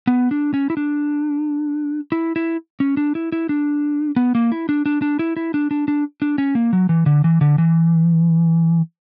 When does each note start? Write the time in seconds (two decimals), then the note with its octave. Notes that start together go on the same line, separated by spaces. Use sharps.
0.07 B3
0.31 D4
0.54 C#4
0.70 E4
0.77 D4
2.12 E4
2.36 E4
2.80 C#4
2.97 D4
3.15 E4
3.32 E4
3.49 D4
4.16 B3
4.35 A#3
4.52 E4
4.69 D4
4.86 D4
5.02 D4
5.19 E4
5.36 E4
5.54 D4
5.71 D4
5.88 D4
6.22 D4
6.38 C#4
6.55 A#3
6.73 F#3
6.89 E3
7.06 D3
7.24 E3
7.41 D3
7.58 E3